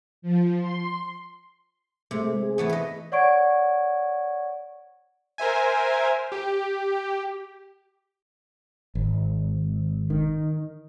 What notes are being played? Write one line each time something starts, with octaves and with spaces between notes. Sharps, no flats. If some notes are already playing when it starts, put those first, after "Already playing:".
F3
C6
C3 G#3 A3
G#4
E3 A3 B3
B4 D#5
C#5 D5 F#5 C#6 G#6 D7
A#4 C5 E5 G#5
G4
G#1
D#3